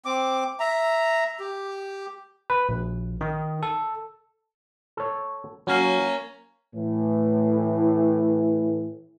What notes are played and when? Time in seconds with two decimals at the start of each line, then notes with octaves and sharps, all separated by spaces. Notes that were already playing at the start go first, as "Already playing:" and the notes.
0.05 C4 D6
0.60 E5 A#5
1.40 G4
2.50 B4
2.69 A#1
3.21 D#3
3.63 A4
4.97 A4 C#5
5.67 F#3 A#3 C#4
6.75 A2 E3